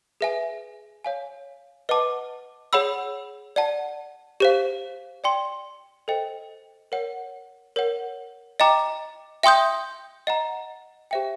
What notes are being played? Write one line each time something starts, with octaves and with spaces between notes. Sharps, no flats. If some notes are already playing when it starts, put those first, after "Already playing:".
G#4 B4 E5 G#5
C#5 F5 G#5
B4 D#5 F#5 A5 D6
G#4 C#5 F#5 B5 E6
D5 F#5 A5
G4 C5 F5
D5 G5 C6
A4 C5 D#5 G5
A#4 C#5 F#5
A#4 C#5 F#5
D#5 G5 A#5 D6
E5 G5 C6 D#6 G6
D#5 F#5 A#5
G4 C5 E5 G5